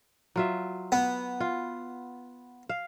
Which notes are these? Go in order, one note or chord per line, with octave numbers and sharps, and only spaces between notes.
F#3 F4 E5
B3
F4
F5